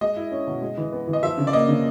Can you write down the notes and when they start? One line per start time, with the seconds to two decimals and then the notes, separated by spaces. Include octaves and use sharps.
0.01 G#3 D#5
0.16 E4
0.31 C#4
0.47 B2
0.62 G#3
0.77 E3
0.92 B3
1.08 E3
1.13 D#5
1.23 F3 E5
1.38 C#3
1.47 D5
1.53 A#3 D#5
1.68 C#3